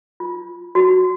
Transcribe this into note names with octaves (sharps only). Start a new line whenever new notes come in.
F4
F#4